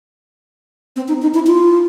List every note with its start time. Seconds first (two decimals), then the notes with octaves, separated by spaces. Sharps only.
0.96 C4
1.08 D#4
1.22 D#4
1.34 E4
1.47 F4